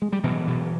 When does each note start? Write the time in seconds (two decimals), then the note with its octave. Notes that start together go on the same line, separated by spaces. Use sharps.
0.02 G#3
0.12 G3
0.24 B2 E3 F#3
0.47 B2